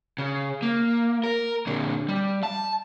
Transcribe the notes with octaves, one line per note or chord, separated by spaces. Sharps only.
C#3
A#3
A#4
A#2 D3
G3
A5